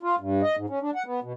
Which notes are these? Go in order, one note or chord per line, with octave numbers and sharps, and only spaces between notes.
F4
G2
D#5
G#2
C#4
D4
F#5
B3
B2